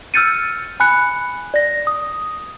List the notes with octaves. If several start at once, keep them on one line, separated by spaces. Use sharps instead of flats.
E6 F6 G6 A6 C#7 D#7
G#5 B5 F#6 C#7
D5 A#6
D#6